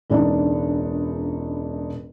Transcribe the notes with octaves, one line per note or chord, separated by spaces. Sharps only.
E1 C#2 D4 D#4